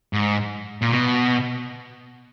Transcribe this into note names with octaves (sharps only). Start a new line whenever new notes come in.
G#2
A#2
B2